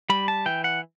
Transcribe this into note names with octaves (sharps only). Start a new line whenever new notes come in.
G3 B5
A5
E3 G5
F#5